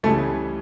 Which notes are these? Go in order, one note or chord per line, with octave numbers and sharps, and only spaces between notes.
C#2 C#3 E3 G3 A3 C#4